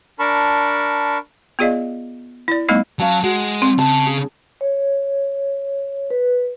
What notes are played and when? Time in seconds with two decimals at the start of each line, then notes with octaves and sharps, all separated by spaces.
0.19 D4 A#4 A5 B5 C#6
1.59 B3 F4 G#4 D5 D#5 F5
2.48 E4 D5
2.69 G3 A3 B3 D#4 D#5
3.00 F#3 C#4 F5 A5
3.23 G#3 F#4
3.62 C4
3.79 C#3 A5
4.06 G#4
4.61 C#5
6.10 B4